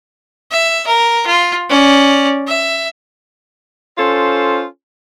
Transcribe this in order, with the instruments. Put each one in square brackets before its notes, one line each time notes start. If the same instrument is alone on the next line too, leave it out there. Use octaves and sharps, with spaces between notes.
[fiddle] E5
A#4
F4
C#4 D5
E5
[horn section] C#4 F4 A4 C5